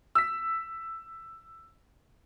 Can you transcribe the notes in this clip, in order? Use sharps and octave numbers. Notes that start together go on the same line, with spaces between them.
E6 B6